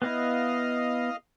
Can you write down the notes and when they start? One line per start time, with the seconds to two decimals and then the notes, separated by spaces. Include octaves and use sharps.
0.02 B3 E4 D#5 F5